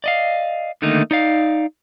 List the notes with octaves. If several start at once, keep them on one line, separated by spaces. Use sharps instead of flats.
D5 D#5 F5
D3 D#3 A3 A#3 D#4
D#4 D5 F5